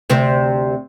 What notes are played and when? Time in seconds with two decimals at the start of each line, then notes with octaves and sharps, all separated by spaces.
0.09 D2 C3 C4